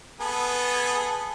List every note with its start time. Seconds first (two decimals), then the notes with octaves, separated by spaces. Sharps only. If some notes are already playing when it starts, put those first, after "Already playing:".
0.20 B3 G#4 A4